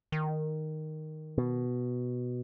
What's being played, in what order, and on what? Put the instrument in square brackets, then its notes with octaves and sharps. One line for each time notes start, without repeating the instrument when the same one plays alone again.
[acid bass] D#3
[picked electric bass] B2